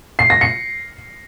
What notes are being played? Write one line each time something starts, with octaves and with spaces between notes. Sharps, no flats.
C7
A#6
C#7